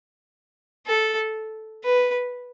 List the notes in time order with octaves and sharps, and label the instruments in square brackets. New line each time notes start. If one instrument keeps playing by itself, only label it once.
[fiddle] A4
B4